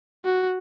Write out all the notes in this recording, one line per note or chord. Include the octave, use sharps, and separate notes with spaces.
F#4